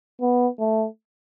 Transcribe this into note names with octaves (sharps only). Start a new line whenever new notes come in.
B3
A3